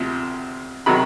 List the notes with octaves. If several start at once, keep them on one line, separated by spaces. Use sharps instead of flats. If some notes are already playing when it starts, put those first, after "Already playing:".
Already playing: D2 C3 F3
C3 D#3 F#3 B5